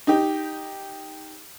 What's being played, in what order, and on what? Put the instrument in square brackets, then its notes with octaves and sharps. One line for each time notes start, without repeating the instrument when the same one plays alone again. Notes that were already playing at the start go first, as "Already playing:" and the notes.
[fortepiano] D#4 G4